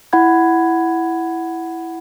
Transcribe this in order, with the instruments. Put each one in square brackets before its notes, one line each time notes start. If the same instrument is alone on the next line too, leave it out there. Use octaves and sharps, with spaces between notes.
[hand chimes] E4 F#5 B5 G#6